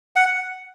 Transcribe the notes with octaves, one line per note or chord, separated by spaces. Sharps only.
F#5